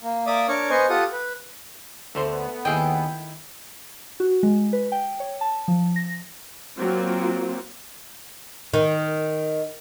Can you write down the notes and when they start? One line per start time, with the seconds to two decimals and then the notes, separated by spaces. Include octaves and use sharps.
0.01 A#3
0.27 A#3 D5 E5 D6 D#6
0.48 D4 A#4 C#5 C#6 D6
0.70 B3 C5 D#5 G#5 C#6
0.90 F4 G4 A4 F#5 D#6
1.12 B4
2.15 D2 D3 A3 B3 C5
2.65 D#2 D#3 E4 G#4 D#5 G5
4.20 F#4
4.43 G#3
4.73 B4
4.92 G5
5.20 C#5
5.41 A5
5.68 F3
5.96 A#6
6.79 F#3 A#3 C4 F4 F#4
8.74 D#3